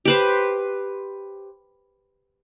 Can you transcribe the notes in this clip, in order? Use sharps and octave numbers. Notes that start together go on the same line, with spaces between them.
G4 B4 C5